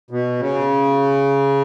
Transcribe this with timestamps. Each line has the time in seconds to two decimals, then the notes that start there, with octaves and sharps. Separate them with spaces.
0.11 B2
0.39 C#3